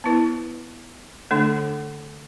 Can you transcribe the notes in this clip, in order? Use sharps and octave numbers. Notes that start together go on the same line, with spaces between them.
B3 E4 B4
D3 A3 D4 A4